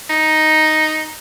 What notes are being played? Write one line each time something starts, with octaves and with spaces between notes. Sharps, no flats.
D#4